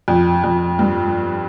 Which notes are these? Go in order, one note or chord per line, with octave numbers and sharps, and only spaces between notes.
F2
F2
G2